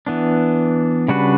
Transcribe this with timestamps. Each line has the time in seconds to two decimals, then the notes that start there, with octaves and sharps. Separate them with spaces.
0.07 E3 B3 D4
1.08 C#3 G3 D4 F#4 B4